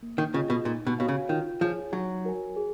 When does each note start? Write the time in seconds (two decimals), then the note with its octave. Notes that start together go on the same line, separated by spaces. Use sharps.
0.03 A#3
0.18 D#3
0.34 C#3 F4 G#4 D#5
0.50 B2
0.65 A#2 D#4
0.87 B2
0.98 B2 F#4 C#5 F5 G#5
1.08 C#3
1.29 D#3 F4
1.61 F3 G#4 C#5 G#5
1.92 F#3 D#4
2.25 F#4 A#4 C#5 G#5
2.56 G#4